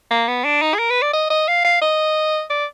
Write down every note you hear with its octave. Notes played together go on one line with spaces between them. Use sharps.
A#3
B3
D4
D#4
G#4
A#4
B4
D5
D#5
D#5
F5
F5
D#5
D5